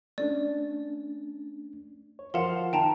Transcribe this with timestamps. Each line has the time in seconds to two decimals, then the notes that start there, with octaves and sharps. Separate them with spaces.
0.18 A3 C#4 D4 D5
2.19 C#5
2.34 F3 A#4 F5 F#5 C6 E7
2.73 D#3 G5 A5 A#5